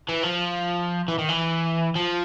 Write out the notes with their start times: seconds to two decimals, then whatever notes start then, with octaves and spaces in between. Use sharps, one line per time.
0.09 E3
0.23 F3
1.08 E3
1.18 D#3
1.29 E3
1.95 F3